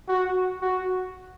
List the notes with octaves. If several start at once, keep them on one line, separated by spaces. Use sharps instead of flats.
F#4
F#4